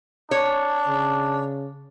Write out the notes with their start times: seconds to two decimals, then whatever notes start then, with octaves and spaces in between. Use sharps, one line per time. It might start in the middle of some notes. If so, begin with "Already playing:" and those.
0.31 D4 C#5
0.88 C#3